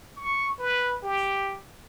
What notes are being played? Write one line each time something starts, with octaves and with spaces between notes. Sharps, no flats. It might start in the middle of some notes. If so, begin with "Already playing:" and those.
C#6
B4
G4